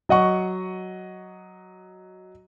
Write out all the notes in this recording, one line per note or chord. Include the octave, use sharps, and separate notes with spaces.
F#3 D#5 F#5 C#6